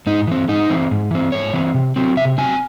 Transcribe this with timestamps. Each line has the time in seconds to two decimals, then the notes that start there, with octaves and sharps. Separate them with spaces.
0.07 G#2 D#4
0.28 E3 C4
0.48 G#2 D#4
0.69 E3 C4
0.91 G#2
1.11 E3 C4
1.32 G#2 C#5
1.53 E3 C4
1.74 C3
1.96 F#3 C4
2.17 C3 E5
2.38 F#3 C4 G#5